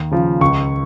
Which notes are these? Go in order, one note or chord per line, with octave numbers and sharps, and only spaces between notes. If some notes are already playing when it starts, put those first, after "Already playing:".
Already playing: D#2
C#3 F3
C#2 C#6